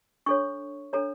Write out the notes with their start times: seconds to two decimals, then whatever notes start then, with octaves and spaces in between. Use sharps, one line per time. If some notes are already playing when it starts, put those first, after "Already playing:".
0.26 D4 A4 C#5 C#6
0.93 D4 A4 C#5 A#5